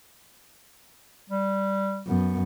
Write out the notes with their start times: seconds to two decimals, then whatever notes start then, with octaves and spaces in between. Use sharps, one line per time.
1.29 G3
2.06 F#2 B3